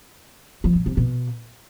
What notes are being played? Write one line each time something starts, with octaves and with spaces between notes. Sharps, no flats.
F3
A#2
C3
B2